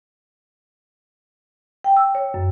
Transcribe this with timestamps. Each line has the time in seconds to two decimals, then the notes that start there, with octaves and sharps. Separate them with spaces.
1.84 G5
1.97 E6
2.15 C#5
2.34 F#2